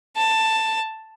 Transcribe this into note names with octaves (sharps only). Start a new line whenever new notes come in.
A5